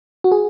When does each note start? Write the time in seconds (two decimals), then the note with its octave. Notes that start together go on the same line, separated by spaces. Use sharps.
0.24 F#4
0.32 G#4